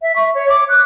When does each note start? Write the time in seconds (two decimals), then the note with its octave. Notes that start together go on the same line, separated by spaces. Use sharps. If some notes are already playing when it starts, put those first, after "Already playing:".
0.02 E5
0.15 C#6
0.34 C#5
0.49 D6
0.68 F#6